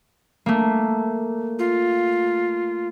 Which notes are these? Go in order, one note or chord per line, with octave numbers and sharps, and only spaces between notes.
A3 A#3
F4